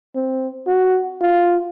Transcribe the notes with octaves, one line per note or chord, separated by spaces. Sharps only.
C4
F#4
F4